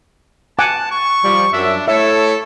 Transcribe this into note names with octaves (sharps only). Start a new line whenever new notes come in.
F#5 G#5 A5 D6
C#6
F3 G3
F#2 D4 E5
A3 E4 A4 C#5 E5